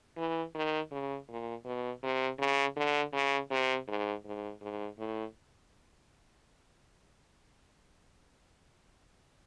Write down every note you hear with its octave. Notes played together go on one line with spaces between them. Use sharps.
E3
D#3
C#3
A#2
B2
C3
C#3
D3
C#3
C3
G#2
G#2
G#2
A2